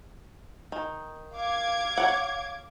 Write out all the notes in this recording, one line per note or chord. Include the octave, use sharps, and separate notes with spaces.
D#3
F5 D6 G#6
C#5 F#5